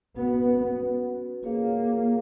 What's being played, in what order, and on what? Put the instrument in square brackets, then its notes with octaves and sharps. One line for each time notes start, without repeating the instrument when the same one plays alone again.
[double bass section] B3 [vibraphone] C#4 F#4 B4
[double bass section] A#3 [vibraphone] F4 G#4 C#5 F5